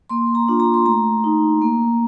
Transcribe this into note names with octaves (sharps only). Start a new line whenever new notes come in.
A#3 C6
A#5
D4 F4
A#5
C6
A3 A#5
D#4
A#3